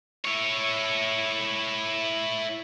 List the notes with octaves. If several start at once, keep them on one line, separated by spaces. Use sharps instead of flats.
E4 C#5